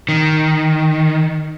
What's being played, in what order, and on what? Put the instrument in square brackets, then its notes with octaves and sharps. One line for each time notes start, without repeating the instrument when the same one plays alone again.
[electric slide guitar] D#3